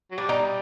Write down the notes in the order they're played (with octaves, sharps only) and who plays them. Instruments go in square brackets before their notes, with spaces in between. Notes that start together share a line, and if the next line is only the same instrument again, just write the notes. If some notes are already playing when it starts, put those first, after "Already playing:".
[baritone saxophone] F#3
[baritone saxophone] G3 [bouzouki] D4
[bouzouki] D#4